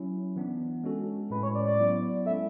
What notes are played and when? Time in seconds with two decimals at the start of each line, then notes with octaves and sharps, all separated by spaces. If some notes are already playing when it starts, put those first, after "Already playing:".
Already playing: F#3 C#4 E4
0.36 E3 B3 D4
0.84 G#3 C#4 F#4 A4
1.31 A2 G#3 C#4 B4
1.43 C#5
1.55 D5
1.67 D5
1.79 F#3 B3 E4
2.26 G#3 C#4 E4 A4 E5